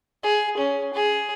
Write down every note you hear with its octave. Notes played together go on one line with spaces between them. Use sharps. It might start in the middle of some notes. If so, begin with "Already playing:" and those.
G#4
C#4
G#4